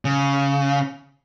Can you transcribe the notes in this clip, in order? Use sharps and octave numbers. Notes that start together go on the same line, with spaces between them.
C#3